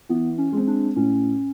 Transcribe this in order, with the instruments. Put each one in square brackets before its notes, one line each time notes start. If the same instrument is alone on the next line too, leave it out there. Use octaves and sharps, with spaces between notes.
[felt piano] E3 [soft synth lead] B3
[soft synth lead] C#4
[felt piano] G#3 C4
[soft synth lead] D4
[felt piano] A2 [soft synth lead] C#4